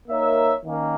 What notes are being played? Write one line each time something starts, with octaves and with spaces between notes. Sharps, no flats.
A#3 D#4 A#4 C#5 E5
D#3 A#3 C#4